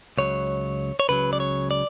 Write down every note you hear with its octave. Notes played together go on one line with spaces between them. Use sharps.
C#2 C#3 F#3 C#5
C#5
C#2 C#3 F#3 B4
D5
C#5
D5